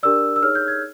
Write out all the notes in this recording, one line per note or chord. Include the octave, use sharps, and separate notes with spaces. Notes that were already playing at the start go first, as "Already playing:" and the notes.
D4 G4 A#4 D5 E6
E6
D#4 G#4 C#5 F6
G6
G#6